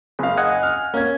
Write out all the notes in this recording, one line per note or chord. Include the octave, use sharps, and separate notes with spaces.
F#1 G#4 F5
D#5 F#5 G#5
F6
A#3 C#4 G#6